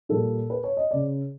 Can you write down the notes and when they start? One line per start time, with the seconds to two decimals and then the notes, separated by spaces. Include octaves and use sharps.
0.09 A#2 G3 A4
0.50 B4
0.64 C#5
0.77 D#5
0.91 C#3 D5